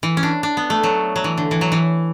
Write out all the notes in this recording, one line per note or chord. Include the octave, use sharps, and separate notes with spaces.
E3
C#4
D4
D4
B3
A3
F#3
F#3
E3
D3
E3
F#3
E3